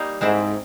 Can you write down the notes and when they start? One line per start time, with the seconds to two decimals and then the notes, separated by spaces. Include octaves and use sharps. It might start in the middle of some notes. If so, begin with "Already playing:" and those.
Already playing: G3 A#3 D#4
0.21 G#2 G#3 C4 E4